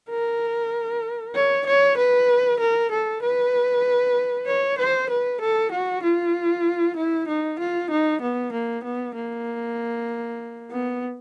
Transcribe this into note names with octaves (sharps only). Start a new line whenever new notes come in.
A#4
C#5
C#5
B4
A#4
A4
B4
C#5
C5
B4
A4
F#4
F4
E4
D#4
F4
D#4
B3
A#3
B3
A#3
B3